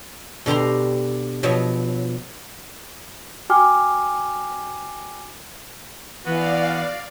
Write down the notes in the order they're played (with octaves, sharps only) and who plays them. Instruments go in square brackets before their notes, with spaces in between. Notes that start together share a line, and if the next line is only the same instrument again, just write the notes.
[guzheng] B2 D3 G4 A#5 C6
B2 F3 F#3
[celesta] F#4 G5 G#5 D6 F6
[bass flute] E3 [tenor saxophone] B3 [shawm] F#4 [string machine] D5 F5